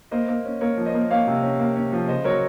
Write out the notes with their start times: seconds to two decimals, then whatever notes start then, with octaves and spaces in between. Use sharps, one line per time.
0.11 A#3 C5 D#5
0.29 A#3
0.45 C#4
0.61 A#3 A#4 C#5
0.77 F3
0.86 C5 D#5
0.94 A#3
1.10 A#3 C#5 F5
1.27 C3
1.43 C#4
1.59 A#3
1.76 C#4
1.93 F3
2.08 C#3 C5 D#5
2.24 F#3 A#4 C#5